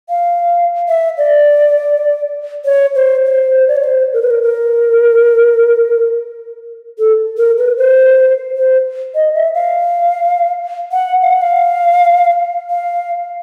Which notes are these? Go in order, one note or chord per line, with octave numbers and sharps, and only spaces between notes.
F5
E5
D5
C#5
C5
C5
D5
C#5
C5
A#4
B4
A#4
A#4
A4
A#4
B4
C5
C5
D#5
E5
F5
F#5
F5
F#5
F5
F5